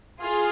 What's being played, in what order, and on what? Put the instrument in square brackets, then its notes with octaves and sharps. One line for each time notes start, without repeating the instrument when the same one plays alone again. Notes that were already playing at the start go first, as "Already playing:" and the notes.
[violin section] F4 G#4